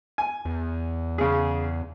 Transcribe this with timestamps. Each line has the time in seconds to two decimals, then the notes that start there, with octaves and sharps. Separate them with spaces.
0.18 G#5
0.45 E2
1.18 C#3 G#4